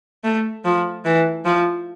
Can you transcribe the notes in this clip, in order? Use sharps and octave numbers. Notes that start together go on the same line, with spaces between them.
A3
F3
E3
F3